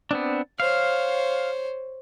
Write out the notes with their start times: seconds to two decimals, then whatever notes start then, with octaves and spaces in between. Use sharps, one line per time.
0.11 B3 C4 D4
0.60 C5 C#5 F5